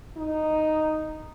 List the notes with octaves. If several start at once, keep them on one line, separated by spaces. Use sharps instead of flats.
D#4